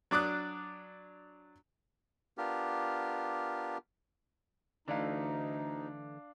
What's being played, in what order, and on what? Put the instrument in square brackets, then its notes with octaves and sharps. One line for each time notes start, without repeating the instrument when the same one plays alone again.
[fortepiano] F#3 D4 D6 D#6 F#6
[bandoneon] B3 D4 F4 G4 A#4
[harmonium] D2 D#4 [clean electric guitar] D3 E3 A3 [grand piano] D4 F5